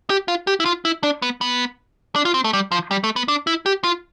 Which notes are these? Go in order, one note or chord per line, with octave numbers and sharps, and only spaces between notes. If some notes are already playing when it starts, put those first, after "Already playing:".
G4
F4
G4
E4
F4
E4
D4
B3
B3
D4
F4
C4
A3
G3
F3
G3
A3
B3
D4
E4
G4
F4